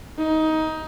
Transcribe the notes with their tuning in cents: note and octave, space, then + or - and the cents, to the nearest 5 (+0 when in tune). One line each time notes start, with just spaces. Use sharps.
D#4 +15